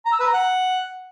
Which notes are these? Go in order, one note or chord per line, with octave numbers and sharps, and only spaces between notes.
A#5
E6
B4
A#5
F#5